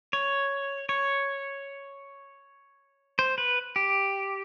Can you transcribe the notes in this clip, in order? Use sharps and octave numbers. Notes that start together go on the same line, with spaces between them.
C#5
C#5
C5
B4
G4